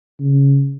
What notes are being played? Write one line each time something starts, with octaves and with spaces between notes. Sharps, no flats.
C#3